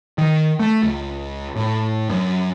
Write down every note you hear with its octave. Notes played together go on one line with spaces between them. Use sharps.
D#3
A3
C#2
A2
F#2